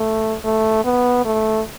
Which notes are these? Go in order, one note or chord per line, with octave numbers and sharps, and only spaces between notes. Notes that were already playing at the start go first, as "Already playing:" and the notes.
Already playing: A3
A3
B3
A3